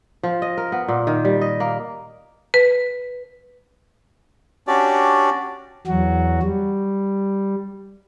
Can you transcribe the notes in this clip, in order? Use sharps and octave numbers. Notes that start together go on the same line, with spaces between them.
F3
D#5
A#4
B3
A#2
D#3
G3
D#5
A#3
B4
C#4 D4 F#4 G4 D5
E2 F#3 F#4
G3